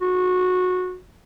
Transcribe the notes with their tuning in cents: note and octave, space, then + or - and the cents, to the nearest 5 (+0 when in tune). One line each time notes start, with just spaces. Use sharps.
F#4 -20